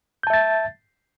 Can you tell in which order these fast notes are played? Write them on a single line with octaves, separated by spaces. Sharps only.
G6 A5 E5 A6